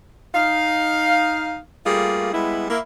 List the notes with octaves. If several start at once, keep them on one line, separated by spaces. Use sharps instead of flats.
D#4 F5
G3 A3 A#3 F4 G#4
G3 G#3 B3 E4
A#3 E4